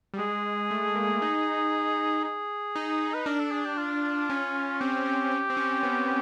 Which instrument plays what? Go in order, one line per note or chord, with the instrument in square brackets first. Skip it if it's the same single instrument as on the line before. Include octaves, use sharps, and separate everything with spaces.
[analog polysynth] G3
[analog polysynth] G#3 [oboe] G#4
[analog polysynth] A3
A#3
D#4
[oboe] G#4
[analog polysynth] D#4
[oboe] B4
[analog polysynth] D4 [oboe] A#4
[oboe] A4
G#4
G4
F4
[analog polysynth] C#4
[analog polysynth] C4 [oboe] G4
[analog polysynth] C#4
C#4
C4
C#4
B3